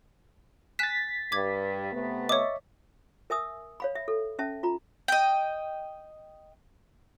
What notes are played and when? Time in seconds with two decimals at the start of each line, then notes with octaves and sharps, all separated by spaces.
0.79 G#5 F#6 A6 B6 E7
1.32 G2 D6 G#6
1.92 C3 A3 B3
2.29 C#5 D#5 E5 C#6 D6
3.30 A#4 E5 G#5 D#6 E6
3.80 C#5 F5 B5
3.95 E5
4.08 A4
4.39 C#4 E5 A5
4.63 F4 A#5
5.08 D#5 G5